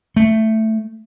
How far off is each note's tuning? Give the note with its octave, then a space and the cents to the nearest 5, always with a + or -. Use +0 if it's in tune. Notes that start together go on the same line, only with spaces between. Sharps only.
A3 +5